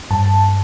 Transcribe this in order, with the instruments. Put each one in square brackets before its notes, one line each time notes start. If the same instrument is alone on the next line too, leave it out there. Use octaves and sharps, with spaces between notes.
[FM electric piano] G2 A5